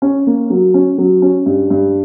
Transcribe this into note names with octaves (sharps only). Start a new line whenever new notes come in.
C#4
A#3
F#3
C#4
F#3
C#4
G2
G2